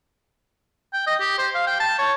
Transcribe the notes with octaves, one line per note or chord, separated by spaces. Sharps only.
G5
D#5
G4
C5
F5
G5
A5
C#5